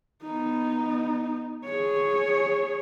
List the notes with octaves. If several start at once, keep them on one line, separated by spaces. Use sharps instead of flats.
B3 D#4
G#4 C#5